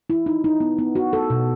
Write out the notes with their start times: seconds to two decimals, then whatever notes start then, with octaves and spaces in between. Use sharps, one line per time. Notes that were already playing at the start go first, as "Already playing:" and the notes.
0.10 E4
0.26 D#4
0.44 D#4
0.60 B3
0.79 B3
0.95 F#4
1.13 A4
1.30 B2